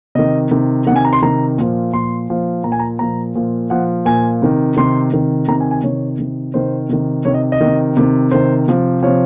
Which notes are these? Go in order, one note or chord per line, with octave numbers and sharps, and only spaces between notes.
C3 D#3 D#5
C3 D#3
C3 D#3 F#5
G#5
A#5
C6
C3 D#3 A#5
A#2 F3
A#2 F3 C6
A#2 F3
A#2 F3 A#5
G#5
A#5
A#2 F3 A#5
A#2 F3
A#2 F3 F#5
A#2 F3 G#5
C3 D#3
C3 D#3 C6
C3 D#3
C3 D#3 A#5
G#5
G#5
C3 D#3 C#5
C3 D#3
C3 D#3 C5
C3 D#3
C3 D#3 C#5
D#5
D#5
C3 D#3
C3 D#3
C3 D#3 C5
C3 F3
C3 F3 C#5